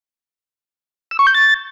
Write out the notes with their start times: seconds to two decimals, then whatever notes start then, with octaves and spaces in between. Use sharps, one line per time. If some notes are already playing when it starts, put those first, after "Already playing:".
1.11 E6
1.19 C#6
1.27 G6
1.34 A6